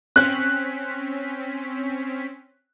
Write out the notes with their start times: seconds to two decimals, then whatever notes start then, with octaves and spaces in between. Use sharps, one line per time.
0.16 C4 C#4 F#6 B6